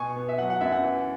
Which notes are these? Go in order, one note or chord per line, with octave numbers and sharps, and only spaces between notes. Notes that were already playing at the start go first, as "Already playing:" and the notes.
Already playing: B2 G#5 C#6
B3
E5
F#3 F#5
F#5
F#2 E5
F#5
E3